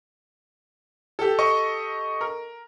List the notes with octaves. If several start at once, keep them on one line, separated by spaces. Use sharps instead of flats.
G4 A4
D#5 C#6
A#4